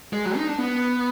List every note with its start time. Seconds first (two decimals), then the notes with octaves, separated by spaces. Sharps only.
0.13 G#3
0.25 F#3
0.37 D#4
0.47 D4
0.58 B3